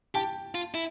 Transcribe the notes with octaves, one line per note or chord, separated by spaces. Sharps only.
G4 G5 A5
F4
E4